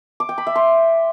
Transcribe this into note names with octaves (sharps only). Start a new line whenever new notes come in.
D6
G5
B5
E5
C6